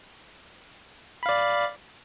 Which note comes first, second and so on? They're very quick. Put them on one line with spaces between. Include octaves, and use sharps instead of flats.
B5 F5 D5